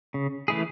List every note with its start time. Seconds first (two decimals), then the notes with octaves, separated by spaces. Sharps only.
0.14 C#3
0.48 E3 A3 E4 G#4